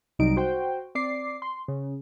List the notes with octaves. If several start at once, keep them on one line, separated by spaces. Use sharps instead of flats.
C2 C3 F#3 G3 D#4 D7
F#4 C5 G5
C4 D5 D6 C7
C6
C#3